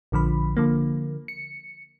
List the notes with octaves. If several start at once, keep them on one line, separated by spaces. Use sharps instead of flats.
A#1 D3 F3 B5
D3 F3 A#3
C#7